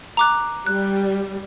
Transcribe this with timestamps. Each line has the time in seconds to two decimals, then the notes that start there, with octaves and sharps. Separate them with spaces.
0.17 A#5 D6 F#6
0.66 G3 F#6